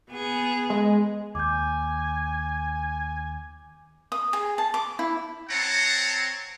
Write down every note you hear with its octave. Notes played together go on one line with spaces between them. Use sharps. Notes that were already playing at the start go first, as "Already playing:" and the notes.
B3 G#4
G#3
D#2 G#5 D6 G6
D#6
G#4
A5
D6
E4
C4 C#5 F#5 A5 A#5